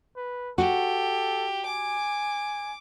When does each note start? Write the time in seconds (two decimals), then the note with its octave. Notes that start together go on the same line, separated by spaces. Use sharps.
0.16 B4
0.58 F#4 G4 A4
1.66 G#5 D6